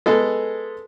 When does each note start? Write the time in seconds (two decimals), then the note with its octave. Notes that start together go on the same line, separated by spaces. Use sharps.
0.06 G#3 B3 A4